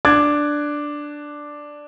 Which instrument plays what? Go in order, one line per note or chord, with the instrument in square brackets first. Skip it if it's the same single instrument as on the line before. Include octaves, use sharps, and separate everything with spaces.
[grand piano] D4 D6 F#6 G#6 A6